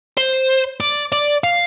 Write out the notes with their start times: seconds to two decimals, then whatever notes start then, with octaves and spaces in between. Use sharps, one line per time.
0.17 C5
0.80 D5
1.12 D5
1.44 F5